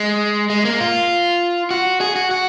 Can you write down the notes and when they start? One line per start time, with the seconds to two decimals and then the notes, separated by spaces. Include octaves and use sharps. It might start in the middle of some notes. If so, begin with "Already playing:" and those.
Already playing: G#3
0.50 G#3
0.65 A#3
0.80 F4
1.71 F#4
2.01 G#4
2.16 F#4
2.31 F#4